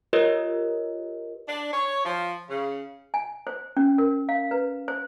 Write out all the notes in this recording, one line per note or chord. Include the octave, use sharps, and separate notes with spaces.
F4 G4 A#4 B4 C#5 D#5
D4
C#5
F3
C#3
G#5
C5
C#4
A#4
F5
B4
C5